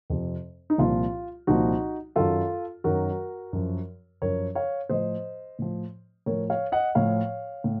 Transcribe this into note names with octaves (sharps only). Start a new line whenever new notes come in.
F2 C3 F3
D#4
C2 A#2 F3 F4
C2 A#2 F3 D#4 F#4
F#2 D#3 F#3 F4 A4
F#2 D#3 F#3 F#4 A#4
F#2 F3
F#2 F3 A#4 C#5
C#5 F5
A2 F3 C5 D#5
A2 F3
A2 F3 A#4 C#5
C#5 F5
D#5 F#5
A2 F3 C#5 F5
A2